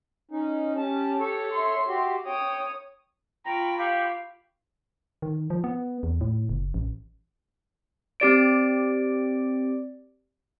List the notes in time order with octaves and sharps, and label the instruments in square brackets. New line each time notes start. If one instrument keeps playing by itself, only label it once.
[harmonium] C#4 D#4
[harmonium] C#4 A5 [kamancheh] G4
[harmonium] A4 C#5
[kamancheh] E5 C6
[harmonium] F#4 G4
[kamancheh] C#5 D#6 [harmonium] G5
[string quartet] F4 B5 C#6 [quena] G5 [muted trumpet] A#5
[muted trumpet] G4 [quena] F5
[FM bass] D#3
F3
B3
E2
A2
F#1
A1
[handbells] C4 G4 D5 D7